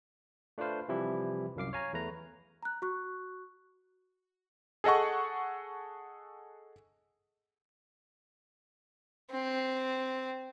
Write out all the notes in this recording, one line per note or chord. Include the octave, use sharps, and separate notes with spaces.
A3 D4 F4 B4 C5 F5
C3 E3 F3 G3 E4 G4
C2 F#2 F5 D6 C7
C#5 F5 G#5 A#5
E2 A3 B4 A#5
A#5 F#6
F#4 C#6 F#6
G#4 A4 D#5 F#5 C#6
C4